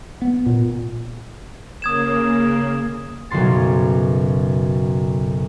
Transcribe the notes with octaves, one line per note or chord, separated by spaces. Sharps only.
B3
A#2
C#3 A#3 D#6 G#6 E7
B1 F#2 C#3 C6 A6